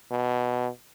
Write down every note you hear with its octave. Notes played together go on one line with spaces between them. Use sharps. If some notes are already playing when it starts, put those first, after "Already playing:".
B2